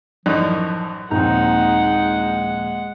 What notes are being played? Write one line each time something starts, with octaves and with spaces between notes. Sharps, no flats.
A1 F#2 F3 D#4 D5
A#1 D#2 G#3 C4 D#4 F#5 A#5